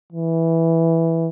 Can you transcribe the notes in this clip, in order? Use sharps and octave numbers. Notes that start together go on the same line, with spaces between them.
E3